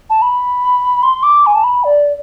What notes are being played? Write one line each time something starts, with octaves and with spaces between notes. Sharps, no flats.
A5
B5
C6
D6
G#5
A5
B5
D5